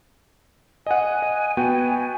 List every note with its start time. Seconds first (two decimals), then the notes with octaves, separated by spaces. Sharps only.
0.87 D#5 F#5 G#5
1.22 D#5
1.57 B3 F#4 G5